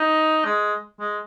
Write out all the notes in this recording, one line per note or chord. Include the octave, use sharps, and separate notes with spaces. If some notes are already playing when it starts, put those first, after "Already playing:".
Already playing: D#4
G#3
G#3